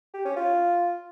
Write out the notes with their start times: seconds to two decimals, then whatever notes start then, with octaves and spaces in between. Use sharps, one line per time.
0.14 G4
0.25 C#4
0.36 F4